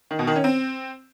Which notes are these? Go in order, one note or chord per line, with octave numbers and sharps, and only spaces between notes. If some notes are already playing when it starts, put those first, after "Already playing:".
D#3
B2
D#3
C#4
C4